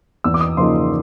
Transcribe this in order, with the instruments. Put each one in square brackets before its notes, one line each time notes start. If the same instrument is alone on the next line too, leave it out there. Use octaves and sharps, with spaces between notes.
[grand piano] E2 E6
D6
D#6
C#3 F3 A#3 D#4 C6